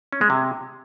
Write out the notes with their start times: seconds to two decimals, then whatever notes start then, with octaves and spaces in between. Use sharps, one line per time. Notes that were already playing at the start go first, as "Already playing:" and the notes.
0.12 C#4
0.21 G#3
0.30 C3